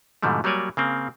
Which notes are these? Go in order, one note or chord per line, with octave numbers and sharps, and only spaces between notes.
G#2 B2 D3 F3 G3 A3
F#3 G3 A#3 C#5 D5 G#5
C#3 A#3 C4